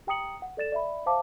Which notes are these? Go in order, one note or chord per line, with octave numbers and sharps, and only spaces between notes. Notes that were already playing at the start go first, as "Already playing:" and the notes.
G4 G5 A#5 D#6 C#7 F#7
F#5
A4 D5 A6 E7
D5 E5 B5
C5 E5 F5 A5 D6